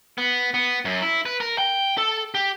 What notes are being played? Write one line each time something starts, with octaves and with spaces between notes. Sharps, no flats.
B3
B3
F#2
E4
B4
A#4
G5
A4
G4